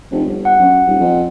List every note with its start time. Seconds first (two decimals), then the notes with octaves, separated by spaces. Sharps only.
0.11 F1
0.25 G1
0.45 F#5
0.59 F#2
0.86 D#1
1.00 F2